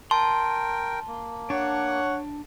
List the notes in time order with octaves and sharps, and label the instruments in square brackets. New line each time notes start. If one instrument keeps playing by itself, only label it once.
[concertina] A#4 G5 [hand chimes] A5 [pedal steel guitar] C6
[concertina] A#3
[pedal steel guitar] D4 [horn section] C#5 F#5